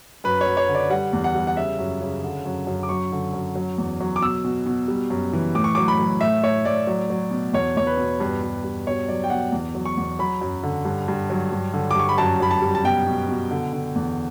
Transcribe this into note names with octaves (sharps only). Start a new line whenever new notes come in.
F#2 B4
C#5
F#3
C#5
D3
D5
G3 F#5
E2
F#5
G3
F#5
C#3 E5
F#2
C#3
D3
F#2
F#2
D6
F#3 C#6
D3
F#2
F#3
E2
F#3
D6
B2 E6
B2
B2
G3
F#2
E3
A2 D6
C#6
F#3 D6
B5
F#3
A2 E5
A2 C#5
A2 D5
F#3
F#3
B2
E2 C#5
E2 C#5
B4
B2
G2 B4
G2
G2
B2 C#5
F#3 D5
G5
B2 F#5
E2
F#3
C#6
E2
F#3 B5
F#2
D3
G2
G2
F#3
G2
D3
D6
G2 C#6
B5
F#2 A5
F#2 B5
A5
G3
A5
B2 G5
B2
B2
D3
D3
E2